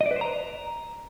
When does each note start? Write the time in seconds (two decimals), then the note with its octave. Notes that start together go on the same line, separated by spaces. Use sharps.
0.01 D#5
0.06 D5
0.11 B4
0.16 C5
0.21 A#5